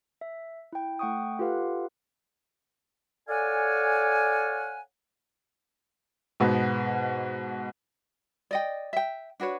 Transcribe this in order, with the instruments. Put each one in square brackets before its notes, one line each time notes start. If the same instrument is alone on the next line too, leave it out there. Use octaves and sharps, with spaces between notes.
[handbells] E5
E4 G5
A3 F#5 G5 C#6 D#6
F4 G4 A4 B4 F5 F#5
[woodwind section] A4 C#5 D5 F5 F#5 G#5
[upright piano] G#2 B2 B3
[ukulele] D5 D#5 G5
E5 G5
D4 F#4 B4 C#5